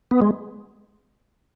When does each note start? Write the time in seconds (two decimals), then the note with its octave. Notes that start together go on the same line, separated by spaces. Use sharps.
0.11 B3
0.21 G#3